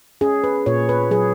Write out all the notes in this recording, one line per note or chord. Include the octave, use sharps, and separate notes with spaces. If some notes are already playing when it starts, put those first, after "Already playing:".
C#4 G#4
B4
A#2 C#5
B4
F#3 G#4